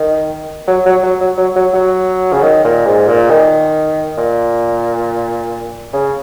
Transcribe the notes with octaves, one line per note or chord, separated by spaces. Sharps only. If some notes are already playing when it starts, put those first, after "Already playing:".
Already playing: D#3
F#3
F#3
F#3
F#3
F#3
F#3
F#3
C#3
D#3
A#2
G#2
A#2
D#3
A#2
C#3